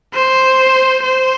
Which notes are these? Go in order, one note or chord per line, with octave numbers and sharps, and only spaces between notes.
C5
C5